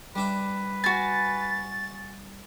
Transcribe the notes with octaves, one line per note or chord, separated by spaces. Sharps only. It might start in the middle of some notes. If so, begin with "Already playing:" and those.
G3 D4 B4 E5
F#4 G#5 A6